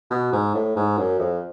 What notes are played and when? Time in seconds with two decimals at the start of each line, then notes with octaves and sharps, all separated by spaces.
0.11 B2
0.32 G#2
0.55 A2
0.76 G#2
0.98 F#2
1.19 F2